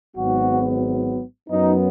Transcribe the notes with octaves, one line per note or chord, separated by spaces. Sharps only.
G#1 G#2 F#3 B3 F#4
F#2 F#3 B3 D#4